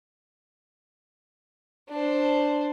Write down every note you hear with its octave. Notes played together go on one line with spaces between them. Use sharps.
D4 C5